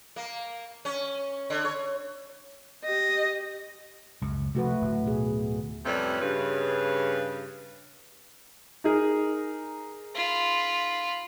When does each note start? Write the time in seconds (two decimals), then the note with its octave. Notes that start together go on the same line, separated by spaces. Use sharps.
0.16 A#3
0.85 C#4
1.50 D3
1.65 C#5
2.84 G4 D#5
4.22 C#2 F#2
4.55 C3 F3 A3 F#4 B4
4.81 D1
5.05 B2 G#4
5.85 F2 C3 G3 A3 C#4 B4
6.21 G2 C#3 B4
8.84 D#4 G#4 A#4
10.15 F4 B5